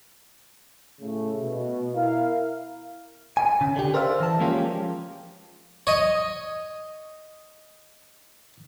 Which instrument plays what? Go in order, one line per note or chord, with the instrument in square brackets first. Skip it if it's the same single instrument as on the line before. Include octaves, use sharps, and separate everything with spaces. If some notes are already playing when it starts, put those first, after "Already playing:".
[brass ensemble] A2 C#3 A3
B2
E4 A#4 F5
[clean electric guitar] G#5
C#3
D3 G4
A#4 C5 D5 E5 F5
E3 A5
F3 G#3 A#3 C#4 F4 G4
[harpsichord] C#5 D#5